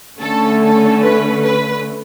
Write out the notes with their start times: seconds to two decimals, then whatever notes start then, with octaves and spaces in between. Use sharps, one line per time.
0.19 D3 A3 C#4 A4
0.61 A4
1.03 B4
1.44 B4